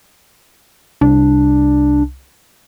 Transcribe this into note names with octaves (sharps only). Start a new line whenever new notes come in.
C2 D4